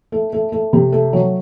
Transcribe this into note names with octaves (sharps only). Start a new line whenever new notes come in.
A3
A3
A3
C3
A3
F#3